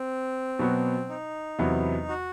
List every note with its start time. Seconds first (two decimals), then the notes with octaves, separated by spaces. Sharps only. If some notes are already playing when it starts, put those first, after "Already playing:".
Already playing: C4
0.59 B2 F#3 B3 F#4
1.09 D#4
1.59 E2 C3 F#3 B3 E4
2.09 F#4